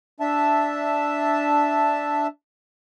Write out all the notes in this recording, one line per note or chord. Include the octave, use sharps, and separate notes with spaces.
D4 E5 A5